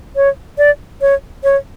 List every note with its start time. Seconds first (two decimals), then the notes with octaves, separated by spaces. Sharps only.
0.16 C#5
0.58 D5
1.01 C#5
1.44 C#5